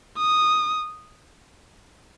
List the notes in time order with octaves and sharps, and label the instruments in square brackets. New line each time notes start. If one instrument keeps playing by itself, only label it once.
[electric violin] D#6